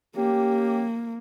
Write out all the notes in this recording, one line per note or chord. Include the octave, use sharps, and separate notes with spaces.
A#3 C#4 G4